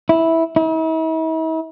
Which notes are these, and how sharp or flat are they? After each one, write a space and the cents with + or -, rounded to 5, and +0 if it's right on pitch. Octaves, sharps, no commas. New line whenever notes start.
E4 -10
E4 -45